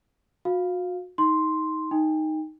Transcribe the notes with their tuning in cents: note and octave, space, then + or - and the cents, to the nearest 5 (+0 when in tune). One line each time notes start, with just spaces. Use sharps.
F#4 -35 F5 +0
D#4 +15 C6 +0
D#4 +0 G5 +35